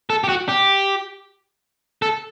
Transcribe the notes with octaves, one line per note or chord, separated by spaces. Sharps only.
A4
G4
F#4
G4
A4